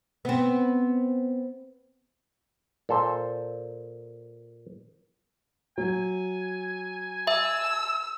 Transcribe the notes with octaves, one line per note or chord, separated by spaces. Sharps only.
B3 C4
A#2 A4 C5
F#3 G#5
E5 E6